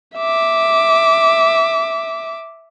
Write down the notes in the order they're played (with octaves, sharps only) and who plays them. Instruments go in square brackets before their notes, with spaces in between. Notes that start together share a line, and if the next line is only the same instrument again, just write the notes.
[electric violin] E5 D6